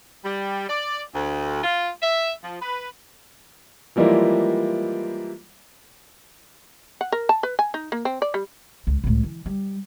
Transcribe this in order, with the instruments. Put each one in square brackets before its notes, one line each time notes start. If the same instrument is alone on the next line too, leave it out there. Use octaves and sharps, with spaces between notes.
[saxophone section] G3
D5
D2
F4
E5
F3
B4
[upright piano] E3 F3 G3 G#3 A#3 E4
[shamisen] F#5
A#4
A5
B4
G#5
D#4
A#3
C4
D5
G3
[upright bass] C#2
C#2 A2
E3
G3